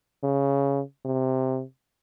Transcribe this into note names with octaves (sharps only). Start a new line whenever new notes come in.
C#3
C3